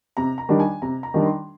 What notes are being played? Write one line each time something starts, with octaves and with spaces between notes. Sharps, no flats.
C3 A#5
A#5
D#3 G3 D4 A#5
G#5
C3 A#5
A#5
D#3 G3 D4
C6